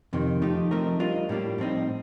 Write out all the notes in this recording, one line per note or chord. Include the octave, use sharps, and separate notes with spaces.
F2 C3 D#3
F3 A3 D#4 G4
F3 A3 C4 D#4 A#4
G3 D4 F4 A#4 D#5
A2 G3 A#3 D4
A2 F3 C4 D#4